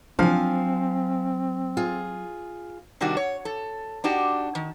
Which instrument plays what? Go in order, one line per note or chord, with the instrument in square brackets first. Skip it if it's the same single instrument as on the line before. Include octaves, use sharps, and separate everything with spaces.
[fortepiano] F3 D4 [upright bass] F#3 [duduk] C4 [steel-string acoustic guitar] F5 G#5
[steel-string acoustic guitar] F4 G#4
[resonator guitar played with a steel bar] C3 D#3 G3 D4 F#4
C#5
A4
D4 D#4 F#4 G4
D#3